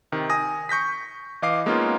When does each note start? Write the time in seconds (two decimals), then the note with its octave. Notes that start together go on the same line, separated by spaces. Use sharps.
0.12 C3 D#3
0.30 G#5 D#6 A#6
0.69 C#6 G6 A#6 B6
1.42 E3 D#5 F5 D6 C7
1.66 G#3 A#3 B3 C#4 D#4 F4